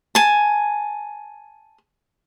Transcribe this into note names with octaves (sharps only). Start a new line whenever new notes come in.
G#5 A5